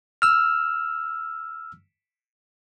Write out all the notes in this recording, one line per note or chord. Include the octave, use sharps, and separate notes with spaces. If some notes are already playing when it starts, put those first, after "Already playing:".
E6 F6